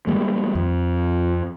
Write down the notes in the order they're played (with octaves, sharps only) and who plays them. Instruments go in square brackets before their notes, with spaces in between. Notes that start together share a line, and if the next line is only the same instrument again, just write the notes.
[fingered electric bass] D#3 G3 G#3 A#3
F2